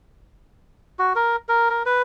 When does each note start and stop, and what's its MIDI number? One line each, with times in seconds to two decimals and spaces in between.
0.99 1.13 66
1.16 1.36 70
1.49 1.69 70
1.70 1.83 70
1.86 2.02 71